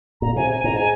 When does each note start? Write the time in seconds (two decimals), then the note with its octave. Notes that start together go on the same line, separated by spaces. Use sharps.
0.21 A#2 A#5
0.36 C3 G#5
0.50 G#5
0.64 G#2 A#5
0.77 G#5